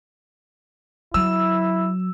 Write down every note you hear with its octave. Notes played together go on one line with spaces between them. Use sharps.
F#3 E4 E6